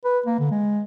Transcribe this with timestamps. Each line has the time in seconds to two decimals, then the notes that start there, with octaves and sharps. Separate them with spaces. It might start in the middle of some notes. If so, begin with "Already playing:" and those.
0.05 B4
0.26 A#3
0.39 D3
0.51 G#3